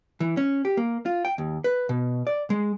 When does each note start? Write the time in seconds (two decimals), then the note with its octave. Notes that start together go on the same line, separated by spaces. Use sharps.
0.20 E3
0.37 C#4
0.65 G4
0.77 A#3
1.06 F4
1.25 G5
1.38 D#2
1.64 B4
1.89 B2
2.27 D5
2.50 G#3